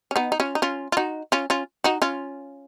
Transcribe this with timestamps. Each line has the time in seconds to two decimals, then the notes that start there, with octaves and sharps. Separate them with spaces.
0.11 C#4
0.16 B3 D#4
0.32 D#4
0.40 C#4 F4
0.55 D#4
0.62 C#4 F4
0.92 F4
0.97 D#4 F#4
1.32 C#4 F4
1.50 C#4 F4
1.84 D#4 F#4
2.02 C#4 F4